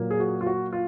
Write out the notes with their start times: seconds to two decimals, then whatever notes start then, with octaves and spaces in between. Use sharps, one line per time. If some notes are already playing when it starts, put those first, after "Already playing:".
Already playing: A#2 F#3 A#3
0.11 G#4
0.20 F#4
0.41 F4
0.46 F#4
0.73 F4